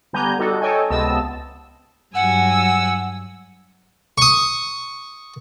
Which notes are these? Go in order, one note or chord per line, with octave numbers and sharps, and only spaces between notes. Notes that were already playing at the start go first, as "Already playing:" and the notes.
D3 G3 B3 G#5 A#5 G6
G3 D#4 F#4 A4
A4 C#5 D#5 G5 G#5
C#2 C3 B3 D#5 A5 E6
G2 F#3 F#5 G#5 E6
C#6 D#6